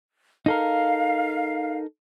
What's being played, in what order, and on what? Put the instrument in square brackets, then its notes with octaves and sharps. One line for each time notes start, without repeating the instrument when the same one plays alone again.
[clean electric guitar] D#4 A4 A#4 [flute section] F5